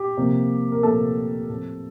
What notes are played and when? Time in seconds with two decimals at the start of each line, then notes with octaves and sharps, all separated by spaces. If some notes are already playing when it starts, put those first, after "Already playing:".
Already playing: G4
0.17 C3 F3 A#3
0.72 A#4
0.83 C3 F3 A3 A#3 A4
1.49 A2 F3 A3 C4